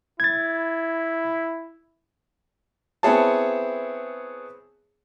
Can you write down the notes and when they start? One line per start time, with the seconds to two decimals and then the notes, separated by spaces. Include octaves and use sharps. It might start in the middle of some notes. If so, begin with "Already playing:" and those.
0.20 E4 G#6 A6
3.03 B3 C4 E4 G#4 C#5 A5